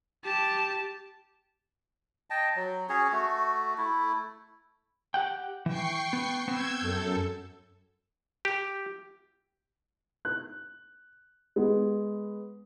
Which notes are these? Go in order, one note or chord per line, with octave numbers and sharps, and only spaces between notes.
G4 A5
D#5 G5 A5
F#3
C#4 F#4 G#4 C#5
A3 F#4
A3 E4
G4 F#5 G5
E3 G5 C#6 C7
B3
B3 C4 E6 G6 G#6
F#2 A4
G4
F#6
G#3 B3